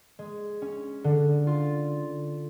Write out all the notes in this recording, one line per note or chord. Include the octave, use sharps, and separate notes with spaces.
G#3
C#4
D3
F4